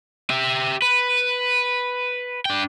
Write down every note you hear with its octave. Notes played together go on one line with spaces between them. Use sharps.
G4 E5
B4
D4 G5